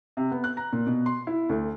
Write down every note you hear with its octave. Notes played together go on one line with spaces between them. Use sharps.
C3
B3
F#6
A#5
A#2
B2
C6
E4
D2